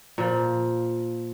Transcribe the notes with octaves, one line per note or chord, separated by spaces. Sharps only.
A#2 F3